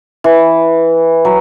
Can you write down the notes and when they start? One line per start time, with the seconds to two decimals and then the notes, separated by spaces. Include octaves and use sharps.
0.24 E3
1.25 F#3